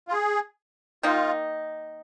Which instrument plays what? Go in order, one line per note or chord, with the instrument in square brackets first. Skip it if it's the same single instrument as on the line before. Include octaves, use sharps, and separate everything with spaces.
[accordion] F4
G#4
[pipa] D#3 A#3 D#4 [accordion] F4